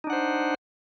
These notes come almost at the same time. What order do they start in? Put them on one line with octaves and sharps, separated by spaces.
D#4 D4 F#5 C5